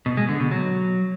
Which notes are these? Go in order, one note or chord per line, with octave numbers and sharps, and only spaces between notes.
B2
G#3
D3
B2
F#3